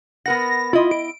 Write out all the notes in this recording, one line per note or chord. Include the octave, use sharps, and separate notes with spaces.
B3 A#4 F#5 A#6
E4 F4 D#5
D7